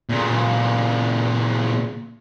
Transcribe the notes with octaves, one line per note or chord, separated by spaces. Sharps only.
A#2 C#3